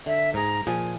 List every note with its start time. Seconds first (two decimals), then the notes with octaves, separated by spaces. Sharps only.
0.06 D3 E5
0.34 G#2 G#4 A#5
0.67 A#2 F3 G#4 G#5